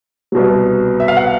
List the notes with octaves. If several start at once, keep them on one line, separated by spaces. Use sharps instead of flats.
C2 B2 F#3
E5
F5
F#5